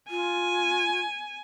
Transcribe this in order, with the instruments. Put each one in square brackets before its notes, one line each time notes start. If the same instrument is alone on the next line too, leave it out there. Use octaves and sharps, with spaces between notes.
[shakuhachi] F4 [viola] G#5